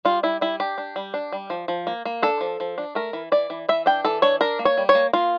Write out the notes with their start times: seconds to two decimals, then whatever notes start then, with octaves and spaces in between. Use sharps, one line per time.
0.05 G3 F4
0.23 G3 E4
0.41 G3 E4
0.60 D4 G4
0.78 D4
0.96 G3
1.14 D4
1.32 G3
1.50 F3
1.68 F3
1.87 A#3
2.05 A#3
2.22 D4 A4
2.41 F3
2.60 F3
2.78 D4
2.95 A3 A#4
3.13 E3
3.32 E3 D5
3.50 E3
3.69 E3 E5
3.86 D4 G5
4.05 E3 A4
4.22 D4 C#5
4.41 D4 A#4
4.59 A#3
4.65 C#5
4.77 G3
4.89 C#5
4.95 A#3
5.13 A#3 F4